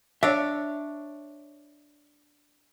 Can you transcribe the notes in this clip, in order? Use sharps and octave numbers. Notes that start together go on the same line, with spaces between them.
D4 C#5 E5